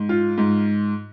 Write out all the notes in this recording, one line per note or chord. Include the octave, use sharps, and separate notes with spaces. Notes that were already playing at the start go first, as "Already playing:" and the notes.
Already playing: G#2
F4
G#2